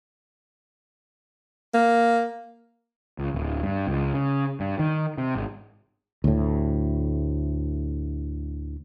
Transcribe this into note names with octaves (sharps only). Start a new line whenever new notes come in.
A#3
C#2
D1
G2
C#2
C#3
G2
D#3
C3
G#1
D2 A2